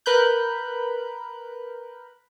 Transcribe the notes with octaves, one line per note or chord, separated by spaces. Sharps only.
A#4 B4 B5 F#6 G6